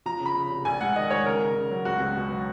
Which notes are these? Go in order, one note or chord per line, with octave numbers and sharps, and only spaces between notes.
F3 A#5
C#3
B5
C#3
F1
A#1 G#5
G#2 F#5
D#3 D#5
G#2 C#5
C#3 A#4
C#3
C#3
F#3
C#2 F#4
C#2
B2
F#3